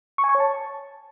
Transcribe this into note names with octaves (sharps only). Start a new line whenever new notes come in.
C#6
G#5
C#6
C#5
A5